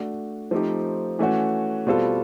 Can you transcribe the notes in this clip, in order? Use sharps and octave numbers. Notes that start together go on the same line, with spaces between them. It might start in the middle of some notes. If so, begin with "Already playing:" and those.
Already playing: A3 D4 F#4
F3 A3 C4 D#4 G4
E3 A3 C#4 F#4
B2 G3 C4 F4 A4